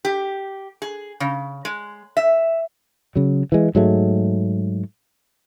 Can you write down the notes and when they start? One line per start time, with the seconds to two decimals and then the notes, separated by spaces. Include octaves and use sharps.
0.05 G4
0.82 G#4
1.20 C#3
1.65 G#3
2.17 E5
3.16 C#3 F#3
3.52 E3 G#3
3.75 G#2 F#3 G#3 A3